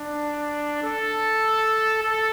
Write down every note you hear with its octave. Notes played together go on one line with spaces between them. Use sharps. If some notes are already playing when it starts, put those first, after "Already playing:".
Already playing: D4
A4
A4